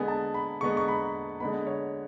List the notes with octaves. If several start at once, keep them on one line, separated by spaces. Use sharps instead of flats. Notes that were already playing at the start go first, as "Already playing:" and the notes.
Already playing: D3 G#3 B3 G#5
A5
B5
D3 G#3 B3 C#6
C#6
B5
D3 G#3 B3 B5
C#5